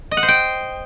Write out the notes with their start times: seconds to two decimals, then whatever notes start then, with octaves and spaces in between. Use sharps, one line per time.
0.11 D#5
0.17 F#5
0.23 C5
0.28 G5